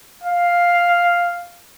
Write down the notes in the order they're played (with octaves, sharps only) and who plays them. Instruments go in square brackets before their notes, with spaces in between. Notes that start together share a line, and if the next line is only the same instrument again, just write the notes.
[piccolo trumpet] F5